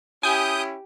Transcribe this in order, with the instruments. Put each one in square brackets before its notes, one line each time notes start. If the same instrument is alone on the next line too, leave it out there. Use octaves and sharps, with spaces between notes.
[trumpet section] C#4 E4 [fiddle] G4 [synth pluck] G#5 [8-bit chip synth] D#6 G6